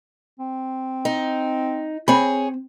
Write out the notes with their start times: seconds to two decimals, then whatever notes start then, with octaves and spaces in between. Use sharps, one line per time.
0.39 C4
1.05 D#4
2.08 C4 G#4 C#5 B5